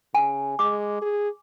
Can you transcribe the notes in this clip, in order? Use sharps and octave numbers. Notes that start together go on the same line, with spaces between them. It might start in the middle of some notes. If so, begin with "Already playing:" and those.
C#3 G#5
G#3 D6
G#4